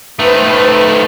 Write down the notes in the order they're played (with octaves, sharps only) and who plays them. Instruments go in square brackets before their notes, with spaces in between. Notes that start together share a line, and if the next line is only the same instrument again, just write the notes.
[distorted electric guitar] D#3 A3 [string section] B4 C5